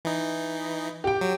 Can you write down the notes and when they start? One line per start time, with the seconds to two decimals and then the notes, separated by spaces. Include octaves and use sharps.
0.05 E3 D#4
1.04 G4 G5
1.21 F#3